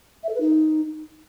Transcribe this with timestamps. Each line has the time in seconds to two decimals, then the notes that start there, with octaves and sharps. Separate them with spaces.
0.23 E5
0.29 A4
0.35 B4
0.40 D#4